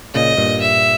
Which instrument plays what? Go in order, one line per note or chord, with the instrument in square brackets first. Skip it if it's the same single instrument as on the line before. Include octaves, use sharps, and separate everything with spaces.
[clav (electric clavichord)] A#2 C#3 [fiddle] D#5
[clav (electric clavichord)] G2 A#2
[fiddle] E5